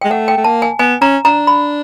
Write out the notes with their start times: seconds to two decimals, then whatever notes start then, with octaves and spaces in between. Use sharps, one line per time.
0.02 G#3 G5
0.11 A3 F#5
0.28 G5
0.37 A3
0.44 A#3 A5
0.62 G#5
0.79 B3 G#5
1.01 C#4 A#5
1.25 D4 A#5
1.47 B5